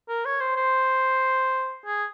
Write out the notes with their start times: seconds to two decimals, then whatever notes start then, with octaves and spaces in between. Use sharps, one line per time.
0.09 A#4
0.25 C#5
0.41 C5
0.57 C5
1.86 G#4